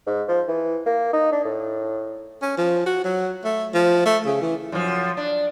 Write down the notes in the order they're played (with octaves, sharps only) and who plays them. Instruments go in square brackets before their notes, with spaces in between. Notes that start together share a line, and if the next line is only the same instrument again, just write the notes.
[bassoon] G#2
F3
E3
A#3
D#4
D4
A2
[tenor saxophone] C#4
F3
F#4
F#3
A3
F3
A3
C#3
E3
[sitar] F#2 F3
D4